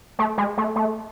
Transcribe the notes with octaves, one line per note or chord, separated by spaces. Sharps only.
A3
G#3
A3
A3